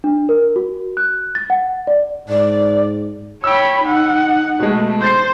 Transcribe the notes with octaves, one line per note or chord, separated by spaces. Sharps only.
D4
A#4
F#4
F#6
A6
F#5
D5
G#2 D5
C#5 G5 B5 E6
D#4 F#5
B2 G#3 A3
C5 G6 A6 C7